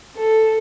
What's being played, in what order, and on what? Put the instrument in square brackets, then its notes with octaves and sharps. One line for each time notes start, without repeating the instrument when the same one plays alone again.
[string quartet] A4